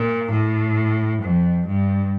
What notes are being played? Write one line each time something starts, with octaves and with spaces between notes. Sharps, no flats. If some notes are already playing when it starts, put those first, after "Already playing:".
Already playing: A#2
A2
F2
G2